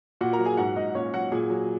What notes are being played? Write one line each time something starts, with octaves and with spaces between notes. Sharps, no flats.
A#2 F#4 F#5
A#4 A#5
F#3
G#4 G#5
G#2 F#4 F#5
G#2 D#4 D#5
A#2 C#4 C#5
F#3 F#4 F#5
A#2 G#4 G#5
F#3